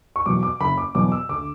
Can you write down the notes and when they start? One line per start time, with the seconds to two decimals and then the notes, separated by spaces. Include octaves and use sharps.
0.16 C#6
0.26 E2 B2 F#3 D6
0.43 D6
0.60 F#1 B5
0.78 D6
0.95 E2 B2 F#3 D6
1.12 E6
1.29 D2 D6